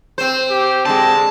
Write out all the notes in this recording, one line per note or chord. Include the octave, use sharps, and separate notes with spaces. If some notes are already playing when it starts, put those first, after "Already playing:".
C4 C5
G4
D3 G#3 C4 A5